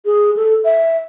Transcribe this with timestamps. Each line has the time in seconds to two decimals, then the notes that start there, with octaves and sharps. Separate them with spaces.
0.05 G#4
0.37 A4
0.65 E5